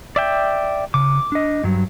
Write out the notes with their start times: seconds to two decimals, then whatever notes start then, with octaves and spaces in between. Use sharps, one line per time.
0.16 D5 E5 G5
0.94 C#3 D6
1.32 D4 D#5
1.64 G2 F#3